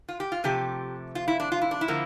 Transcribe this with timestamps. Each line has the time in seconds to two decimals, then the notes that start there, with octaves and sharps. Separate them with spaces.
0.09 F4
0.20 G4
0.32 F4
0.44 C3 F3 A3 G4
1.15 F4
1.28 E4
1.40 D4
1.52 F4
1.61 E4
1.71 D4
1.81 E4
1.88 D3 F3 A#3